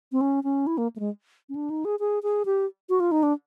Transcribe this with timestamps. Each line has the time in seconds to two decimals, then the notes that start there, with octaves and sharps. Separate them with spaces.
0.12 C4
0.21 C#4
0.44 C#4
0.67 E4
0.78 A#3
0.96 A3
1.00 G#3
1.49 C#4
1.55 D4
1.70 D#4
1.85 G#4
2.00 G#4
2.23 G#4
2.45 G4
2.89 F#4
3.00 F4
3.11 D#4
3.23 D4